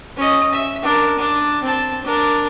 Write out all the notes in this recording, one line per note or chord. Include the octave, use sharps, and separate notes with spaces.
C#4 D#5
E5
D4 A#4
D4
C4 A5
D4 A#4